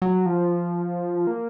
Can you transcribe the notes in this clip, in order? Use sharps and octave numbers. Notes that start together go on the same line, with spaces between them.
F#3
F3
A#3